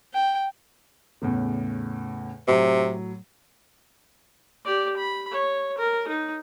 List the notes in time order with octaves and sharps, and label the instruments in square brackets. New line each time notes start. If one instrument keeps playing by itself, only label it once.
[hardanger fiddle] G5
[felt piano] E2 A2 C#3
[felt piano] A2 F#3 [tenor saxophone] C3
[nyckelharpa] G4 D5
B5
C#5
A#4
D#4